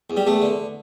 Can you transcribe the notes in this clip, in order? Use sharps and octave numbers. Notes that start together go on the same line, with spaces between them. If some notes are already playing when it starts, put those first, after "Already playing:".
E2
G3
E2 A3
D3